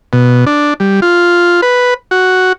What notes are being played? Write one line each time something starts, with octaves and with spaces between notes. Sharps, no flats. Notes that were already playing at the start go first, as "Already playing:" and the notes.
B2
D4
G3
F4
B4
F#4